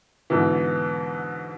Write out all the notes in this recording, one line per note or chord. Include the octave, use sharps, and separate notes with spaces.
G#2 B2 D3 E3